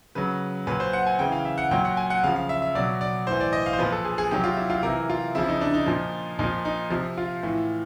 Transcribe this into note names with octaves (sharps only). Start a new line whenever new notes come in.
C#3 F#3 B4
A#2 F#3 B4
C5
F#5
G#5
C#3 E3 G5
F5
E5
F#5
A#2 F#3 G5
F#5
G#5
F#5
C#3 F3 F5
F5
E5
E5
B2 F#3 D5
D5
A2 E3 C5
D5
D#5
F5
C5
A#2 F3 B4
A4
G#4
G#4
C3 D#3 F#3 G4
F4
E4
F4
C3 E3 A#4
F4
C#3 F3 E4
D#4
D4
D#4
A#2 F3
A#2 F3 D#4
D#4
C3 F3
F4
A2 E3